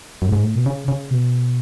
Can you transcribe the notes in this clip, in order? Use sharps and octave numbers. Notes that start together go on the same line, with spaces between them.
F#2
A2
G#2
A2
B2
C#3
C#3
B2